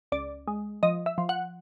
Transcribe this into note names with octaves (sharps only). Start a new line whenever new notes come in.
C#2 D5
G#3
F3 D#5
E5
F3
F#5